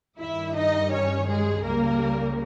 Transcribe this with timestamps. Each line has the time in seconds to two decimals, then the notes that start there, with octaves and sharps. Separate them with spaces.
0.19 G2 D#3 G3 E4 E5
0.55 D#4 D#5
0.92 C#4 C#5
1.27 G#3 G#4
1.63 C#2 C#3 G3 A#3 A#4